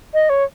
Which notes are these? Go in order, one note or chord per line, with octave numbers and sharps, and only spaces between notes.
D#5
C#5